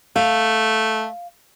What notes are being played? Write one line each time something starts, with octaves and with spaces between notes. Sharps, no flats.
A3 F5